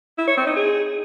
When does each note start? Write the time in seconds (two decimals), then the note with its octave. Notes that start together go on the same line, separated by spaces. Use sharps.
0.18 E4
0.28 C#5
0.37 C4
0.47 D#4
0.56 G#4